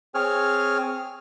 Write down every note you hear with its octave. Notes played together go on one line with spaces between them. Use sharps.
C4 G#4 C#5 F6